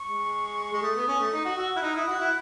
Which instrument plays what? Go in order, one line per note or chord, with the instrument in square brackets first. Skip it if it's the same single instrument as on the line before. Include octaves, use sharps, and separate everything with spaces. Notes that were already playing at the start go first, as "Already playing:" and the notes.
Already playing: [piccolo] C#6
[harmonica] G#3
G#3
[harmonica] A3 [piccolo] D#6
[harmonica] B3
C#4
A3
D#4
F#4
[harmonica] F#4 [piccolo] E6
[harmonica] E4 [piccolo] F#6
[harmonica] D#4
[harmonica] E4 [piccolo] D#6
[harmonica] F#4
[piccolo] F#6
[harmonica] E4